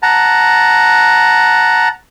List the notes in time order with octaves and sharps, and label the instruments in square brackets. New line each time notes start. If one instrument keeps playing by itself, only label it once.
[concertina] F#5 A5 A#5